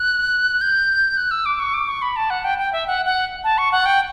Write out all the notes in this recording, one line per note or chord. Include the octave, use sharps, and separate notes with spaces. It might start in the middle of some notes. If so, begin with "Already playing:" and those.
Already playing: F#6
G6
F#6
E6
D6
C#6
D6
C#6
B5
A5
F#5
G5
G5
E5
F#5
F#5
A5
C#6
F#5
G5